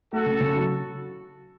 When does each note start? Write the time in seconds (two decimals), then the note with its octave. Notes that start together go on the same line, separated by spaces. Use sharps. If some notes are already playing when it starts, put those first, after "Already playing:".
0.12 A3 F#4 A4
0.26 C#3
0.40 C#3
0.55 F#3